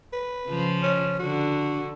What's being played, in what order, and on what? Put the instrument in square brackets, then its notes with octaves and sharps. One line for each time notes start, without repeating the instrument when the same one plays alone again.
[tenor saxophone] B4
[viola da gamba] C#3 F3
[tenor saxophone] C#4
[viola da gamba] D3 [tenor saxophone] F#4